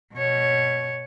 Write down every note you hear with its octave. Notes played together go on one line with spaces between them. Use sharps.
B2 C#5